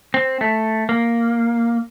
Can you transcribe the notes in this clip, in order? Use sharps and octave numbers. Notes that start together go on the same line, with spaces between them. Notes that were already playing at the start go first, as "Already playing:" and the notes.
C4
A3
A#3